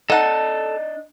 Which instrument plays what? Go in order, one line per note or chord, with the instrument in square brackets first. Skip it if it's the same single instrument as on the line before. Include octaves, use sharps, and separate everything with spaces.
[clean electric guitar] D4 D#5 [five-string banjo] D#4 F#5 [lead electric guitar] A4 A5